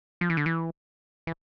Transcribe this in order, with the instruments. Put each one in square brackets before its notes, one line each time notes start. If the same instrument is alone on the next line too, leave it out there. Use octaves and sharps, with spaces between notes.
[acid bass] F3
E3
D3
E3
E3